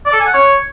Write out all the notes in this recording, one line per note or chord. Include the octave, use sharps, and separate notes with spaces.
D5
A4
G#5
F#5
C#5